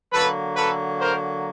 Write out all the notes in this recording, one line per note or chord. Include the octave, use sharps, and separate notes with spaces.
D3 F#3 A#3 A4 B4
A4 B4
A#4 C5